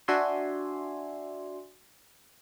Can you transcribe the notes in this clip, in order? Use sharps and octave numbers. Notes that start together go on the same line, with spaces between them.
D4 F#4 D5 E5 G#5 C6